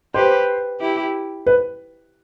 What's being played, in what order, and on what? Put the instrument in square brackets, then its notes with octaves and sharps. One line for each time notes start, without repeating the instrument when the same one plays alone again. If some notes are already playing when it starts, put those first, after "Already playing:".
[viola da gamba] G4 B4 [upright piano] C5
[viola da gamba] E4 G4
[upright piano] B4